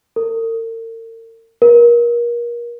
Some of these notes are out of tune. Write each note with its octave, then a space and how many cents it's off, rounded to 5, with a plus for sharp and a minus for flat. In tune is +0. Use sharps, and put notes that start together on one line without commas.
A#4 -45
A#4 +30